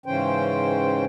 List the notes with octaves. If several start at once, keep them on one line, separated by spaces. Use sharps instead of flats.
G#2 C#3 E3 C#4 C5 G5